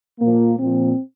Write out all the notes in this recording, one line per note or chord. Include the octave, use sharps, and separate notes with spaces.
A#2 F3 A#3
A#2 F3 C4